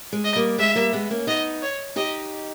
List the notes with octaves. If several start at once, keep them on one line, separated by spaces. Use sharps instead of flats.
G#3
D#5
G3 A#3
G#3 B3 E5
G3 A#3
G#3 B3
A#3 C#4
B3 D#4 D#5
C#5
D#4 G4 D#5